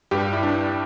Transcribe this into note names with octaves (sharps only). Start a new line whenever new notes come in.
G2 G3 G4
E4
D4